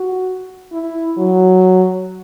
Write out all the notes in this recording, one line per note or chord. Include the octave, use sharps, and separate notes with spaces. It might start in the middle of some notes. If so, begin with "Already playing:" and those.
Already playing: F#4
E4
F#3